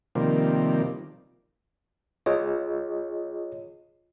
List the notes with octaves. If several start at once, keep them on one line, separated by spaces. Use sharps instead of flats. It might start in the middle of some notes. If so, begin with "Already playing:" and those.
C3 D#3 F3 G3 A#3
F4 G#4 C#5 D#5